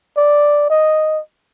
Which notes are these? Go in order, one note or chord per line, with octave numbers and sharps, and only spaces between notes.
D5
D#5